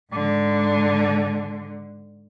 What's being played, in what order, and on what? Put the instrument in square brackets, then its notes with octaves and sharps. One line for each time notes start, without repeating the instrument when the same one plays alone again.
[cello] G#2 D3